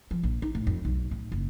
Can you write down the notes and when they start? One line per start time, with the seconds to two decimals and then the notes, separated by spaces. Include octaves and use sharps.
0.11 F3
0.23 A#1
0.42 D#4
0.55 A2
0.67 F2
0.85 B1
1.11 A2
1.32 F#1